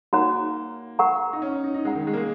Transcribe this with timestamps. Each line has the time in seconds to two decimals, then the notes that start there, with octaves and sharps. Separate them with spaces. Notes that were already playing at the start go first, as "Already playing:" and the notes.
0.13 A#3 D#4 F#4 C#5 F#5 A#5
0.99 A#4 F#5 A#5 C#6
1.33 D#4
1.42 C#4
1.64 D#4
1.74 D#4
1.85 G#3 A#4 C#5 F#5 A#5
1.95 D#3
2.07 G#3
2.13 A#3
2.17 G#3